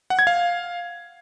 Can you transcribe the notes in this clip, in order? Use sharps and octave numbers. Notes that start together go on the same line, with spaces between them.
F#5
G#6
F5